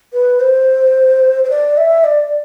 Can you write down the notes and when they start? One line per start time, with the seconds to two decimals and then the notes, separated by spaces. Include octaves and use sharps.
0.13 B4
0.40 C5
1.44 C5
1.50 D5
1.77 E5
2.04 D5